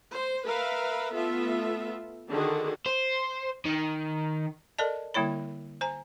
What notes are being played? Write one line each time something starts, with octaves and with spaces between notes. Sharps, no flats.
C5
A#4 B4 E5 F5
A3 B3 F4 A4 E5
D3 D#3 D4 F#4 G#4
C5
D#3
A4 A#4 D5 D#5 A5
D3 G3 A#3 E4 C#5 B5
C5 G#5 A#5